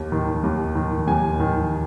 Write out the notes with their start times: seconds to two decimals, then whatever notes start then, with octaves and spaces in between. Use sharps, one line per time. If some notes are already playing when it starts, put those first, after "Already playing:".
Already playing: D#2
0.12 D#3
0.43 D#2
0.75 D#3
1.07 D#2 G#5
1.40 D#3